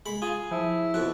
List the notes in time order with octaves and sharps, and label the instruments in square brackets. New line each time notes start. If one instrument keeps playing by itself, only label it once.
[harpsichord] G#3 B5
[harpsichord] F4 [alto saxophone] G#4
[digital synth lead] F3 [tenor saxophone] E4
[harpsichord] F2 B2 [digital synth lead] F#6